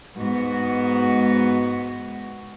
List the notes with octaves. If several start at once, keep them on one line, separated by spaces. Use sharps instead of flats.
G#2 B3 F#4